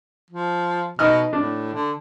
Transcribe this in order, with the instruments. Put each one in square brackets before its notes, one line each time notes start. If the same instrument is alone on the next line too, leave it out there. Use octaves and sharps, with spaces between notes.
[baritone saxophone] F3
[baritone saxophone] B2 [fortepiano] D#4 D#5 F6
[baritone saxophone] A2 [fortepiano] D4
[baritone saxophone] D3